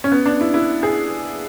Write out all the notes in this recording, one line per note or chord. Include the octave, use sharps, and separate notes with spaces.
C#4
B3
D4
E4
E4
G#4